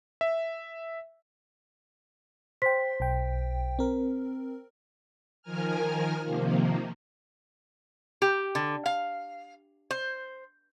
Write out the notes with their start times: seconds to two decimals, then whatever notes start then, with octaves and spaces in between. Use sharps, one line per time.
0.21 E5
2.62 C5 G5 C6 B6
3.00 B1 G5
3.79 C4 A#4
5.42 D#3 F3 A#4 G#5 F6
6.23 C3 D#3 F3 A#3
8.22 G4
8.55 D3
8.86 F5
9.91 C5